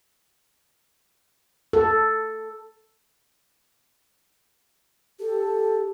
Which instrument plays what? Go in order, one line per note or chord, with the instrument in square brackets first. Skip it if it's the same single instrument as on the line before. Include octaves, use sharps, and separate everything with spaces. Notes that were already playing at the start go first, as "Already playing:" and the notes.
[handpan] A4
[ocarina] G4 [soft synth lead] A4